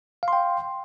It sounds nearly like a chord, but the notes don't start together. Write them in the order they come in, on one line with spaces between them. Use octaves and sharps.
F5 C6 G5